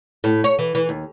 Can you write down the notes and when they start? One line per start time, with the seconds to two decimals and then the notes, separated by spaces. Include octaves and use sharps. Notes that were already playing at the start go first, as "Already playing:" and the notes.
0.24 A2
0.44 C#5
0.59 E3
0.75 E3
0.89 D#2